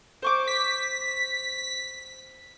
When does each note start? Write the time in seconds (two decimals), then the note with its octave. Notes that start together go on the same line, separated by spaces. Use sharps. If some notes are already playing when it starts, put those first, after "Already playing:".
0.22 C5 C#6 D6
0.48 B6